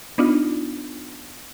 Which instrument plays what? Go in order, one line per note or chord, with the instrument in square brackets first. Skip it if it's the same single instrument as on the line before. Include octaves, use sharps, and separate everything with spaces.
[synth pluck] B3 D4 D#4 F4